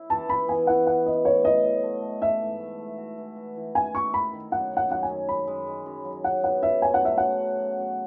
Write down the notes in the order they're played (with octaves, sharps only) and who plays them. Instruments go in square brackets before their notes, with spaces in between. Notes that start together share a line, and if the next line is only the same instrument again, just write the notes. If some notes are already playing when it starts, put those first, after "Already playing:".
Already playing: [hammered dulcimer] E4
[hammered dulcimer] E3 [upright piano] A5
[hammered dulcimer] E3 [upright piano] B5
[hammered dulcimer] B3 [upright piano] G#5
[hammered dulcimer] E3 [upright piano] F#5
[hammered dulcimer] B3 [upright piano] F#5
[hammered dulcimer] B3 [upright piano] D#5
[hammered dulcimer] A2 [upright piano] C#5
[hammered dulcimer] F#3 [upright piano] D#5
[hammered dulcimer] A2
A3
A3
[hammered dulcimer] E3 [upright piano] E5
[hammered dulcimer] G#2
A3
A3
F#4
E3
F#4
E3
[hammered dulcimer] D#3 [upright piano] G#5
[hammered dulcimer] E4 [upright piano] C#6
[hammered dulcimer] D#3 [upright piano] B5
[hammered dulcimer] D#3
[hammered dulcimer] F#2 [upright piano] F#5
[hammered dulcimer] D#3
[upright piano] F#5
[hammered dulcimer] F#2 [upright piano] F#5
[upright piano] G#5
[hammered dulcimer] F#2
[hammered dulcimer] G#3 [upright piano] B5
[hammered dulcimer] G#3
G#3
F#2
F#3
[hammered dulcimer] F#3 [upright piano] F#5
[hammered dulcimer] B3 [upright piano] F#5
[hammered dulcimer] C#3 [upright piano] E5
[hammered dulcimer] A3 [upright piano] G#5
[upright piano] F#5
[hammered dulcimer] F#3 [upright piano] E5
[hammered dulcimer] F#3 [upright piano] F#5
[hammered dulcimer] F#3
F#2
F#2